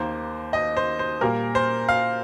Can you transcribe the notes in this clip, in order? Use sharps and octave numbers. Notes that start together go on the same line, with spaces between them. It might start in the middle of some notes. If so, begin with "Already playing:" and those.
Already playing: D#2 D#3 A#3 C5
D#5
C5
C5
A#2 G3 A#3 A#4
C5
F5